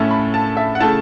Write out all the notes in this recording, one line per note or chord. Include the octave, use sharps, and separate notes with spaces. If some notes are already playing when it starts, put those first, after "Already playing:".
Already playing: A2 A3 C#4 E4 A5
B5
A5
E5
F#5
C#3 A3 E4 A5